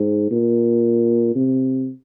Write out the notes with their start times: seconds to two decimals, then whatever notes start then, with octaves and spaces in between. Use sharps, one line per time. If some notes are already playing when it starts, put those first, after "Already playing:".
Already playing: G#2
0.31 A#2
1.35 C3